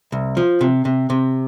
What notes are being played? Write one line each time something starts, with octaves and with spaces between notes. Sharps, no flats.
C2
F3
C3
C3
C3